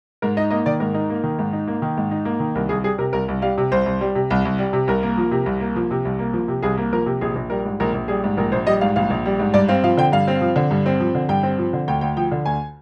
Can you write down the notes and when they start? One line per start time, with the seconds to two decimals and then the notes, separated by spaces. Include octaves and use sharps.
0.22 G#2 A#4
0.37 D#4 D#5
0.51 A#3 D#5
0.66 D#3 D5
0.80 G#2 A#4
0.94 D#4
1.10 A#3
1.23 D#3
1.39 G#2
1.53 D#4
1.67 A#3
1.82 D#3
1.97 G#2
2.11 D#4
2.25 A#3
2.40 D#3
2.55 C2 A#4
2.69 C2 G#4
2.84 G3 G#4
2.98 C3 A#4
3.13 C2 A#4
3.28 C2
3.42 G3 F5
3.58 C3
3.72 C2 C5
3.86 C2
4.01 G3
4.15 C3
4.30 C2
4.45 C2
4.58 G3
4.73 C3
4.88 C2 A#4
5.03 A#3
5.17 F3
5.31 C3
5.46 C2
5.60 A#3
5.76 F3
5.91 C3
6.05 C2
6.19 A#3
6.33 F3
6.48 C3
6.62 C2 G#4
6.78 A#3
6.92 F3 A#4
7.06 C3
7.21 A#1 G#4
7.35 A#1
7.50 G3 A#4
7.65 G#2
7.80 A#1 A#4
7.94 A#1
8.08 G3 G#4
8.24 G#2
8.37 A#1 A#4
8.52 A#1 C5
8.67 G3 D#5
8.81 G#2 F5
8.96 A#1 F5
9.10 A#1
9.25 G3
9.39 G#2
9.54 G2 D5
9.68 C4 F5
9.84 F3 F5
9.97 D3 G5
10.12 G2 F5
10.28 C4
10.41 F3
10.56 D3
10.71 G2
10.86 C4
11.00 F3
11.15 D3
11.29 G2 G5
11.43 C4
11.58 F3
11.73 D3
11.88 D2 G5
12.01 D2 G5
12.17 F3 G5
12.31 D3
12.46 D2 G#5